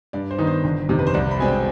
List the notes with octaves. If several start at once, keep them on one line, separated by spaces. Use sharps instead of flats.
G2 D5
C5
D#3 B3 D#4
C5
G1
F2 C3 D#3
B4
C5
C2 D5
B5
B2 G#3 C4 G#5
G5